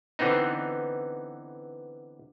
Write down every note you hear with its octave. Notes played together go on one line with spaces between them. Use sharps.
D3 E3 B3 C4 D#4